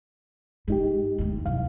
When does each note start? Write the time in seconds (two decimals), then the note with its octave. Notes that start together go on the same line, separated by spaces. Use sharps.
0.68 G#2 G#3 D#4 G4
1.18 G1 D2
1.46 C2 F#2 F5